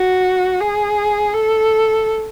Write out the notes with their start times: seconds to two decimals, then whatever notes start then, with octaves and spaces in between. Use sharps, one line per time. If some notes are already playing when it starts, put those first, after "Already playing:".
Already playing: F#4
0.61 G#4
1.34 A4